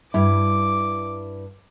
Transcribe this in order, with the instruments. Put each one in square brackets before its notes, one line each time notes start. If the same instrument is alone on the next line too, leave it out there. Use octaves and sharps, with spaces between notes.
[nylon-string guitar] G2 E4 [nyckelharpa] D6